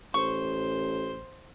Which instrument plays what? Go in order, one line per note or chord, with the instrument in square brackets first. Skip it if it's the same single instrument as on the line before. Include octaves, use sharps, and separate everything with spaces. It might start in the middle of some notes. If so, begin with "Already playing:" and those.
[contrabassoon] A1 [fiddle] C5 [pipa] C#6